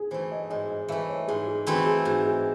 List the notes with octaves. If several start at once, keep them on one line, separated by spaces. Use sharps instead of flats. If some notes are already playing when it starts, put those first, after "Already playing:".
Already playing: G#4
E3 A3 C5
D#5
G#2 D#5
D#5
E3 A3 E5
C#5
G#2 G#4
G#4
E3 A3 C4 E4 F#4
G#4
G#2 F#4
G#4